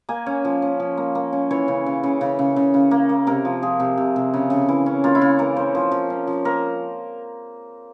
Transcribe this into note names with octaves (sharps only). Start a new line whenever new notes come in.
A#3 G#5
C#4
F3
C#4
F3
A#3
A#3
C#4
E3 C#5
C#3
C#3
C#3
C#3
C#3
C#3
C#3
A#3
A#3
C3 A#4
F3
F3 G#4
C3
C3
C3
C#3
C#3
E3
C#4
A#3 F4
E4
C#3 F4
E3 A#4
C#4 C5
F3 C5
F3
C#4
F3
A#3 A#4